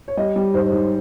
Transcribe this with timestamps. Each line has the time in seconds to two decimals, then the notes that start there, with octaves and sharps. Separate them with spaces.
0.08 C#5
0.17 G3 D#5
0.36 G3
0.54 G#2 C5
0.72 G#2